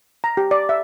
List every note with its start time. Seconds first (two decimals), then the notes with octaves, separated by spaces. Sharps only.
0.24 A#5
0.37 G4
0.51 D5
0.69 E5